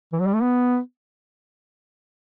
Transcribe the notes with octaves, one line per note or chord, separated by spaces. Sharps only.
E3
F#3
G3
A3
B3